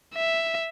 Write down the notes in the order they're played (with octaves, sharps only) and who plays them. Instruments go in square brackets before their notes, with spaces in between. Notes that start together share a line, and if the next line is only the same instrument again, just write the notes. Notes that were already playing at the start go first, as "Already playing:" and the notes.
[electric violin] E5